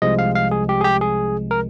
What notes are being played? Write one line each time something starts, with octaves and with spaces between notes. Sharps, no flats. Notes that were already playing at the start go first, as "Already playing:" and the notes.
C2 C3 F3 G#3 D#5
F5
F5
G#4
G4
G#4
G4
G#4
A#4